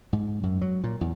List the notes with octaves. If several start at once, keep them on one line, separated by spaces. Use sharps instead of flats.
G#2
F#2
F#3
A#2
E2